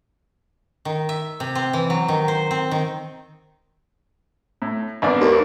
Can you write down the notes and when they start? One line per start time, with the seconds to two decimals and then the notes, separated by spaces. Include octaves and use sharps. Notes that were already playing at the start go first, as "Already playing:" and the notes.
0.85 D#3
1.09 E5
1.40 C3
1.55 C4
1.73 E3
1.90 F#3
2.08 D#3
2.28 C5
2.51 C4
2.71 D#3
4.62 A2
5.02 G#1 B3 D4
5.20 D#2